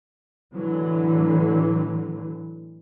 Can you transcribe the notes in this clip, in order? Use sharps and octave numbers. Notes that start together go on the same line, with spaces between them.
A2 D3 E3 F#3